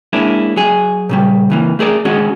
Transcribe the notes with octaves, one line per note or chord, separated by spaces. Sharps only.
G#3 A#3 C#4 D4 E4
F#3 G#4
A#2 C#3 G3
C#2 E3 A#3
A3 G#4 A#4 D5
D#3 G#3 C#4 F#4 G#4